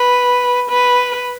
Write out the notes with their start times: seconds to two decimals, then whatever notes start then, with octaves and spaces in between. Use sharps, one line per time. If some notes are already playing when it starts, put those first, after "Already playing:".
Already playing: B4
0.70 B4